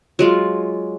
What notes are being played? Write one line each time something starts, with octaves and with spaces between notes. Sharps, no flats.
F#3 G#3 F4